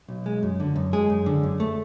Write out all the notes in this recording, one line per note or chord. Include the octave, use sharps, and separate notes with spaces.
B1
G#3
F#2
D3
F#2
G#3 G#4
F#2
D3
F#2
A3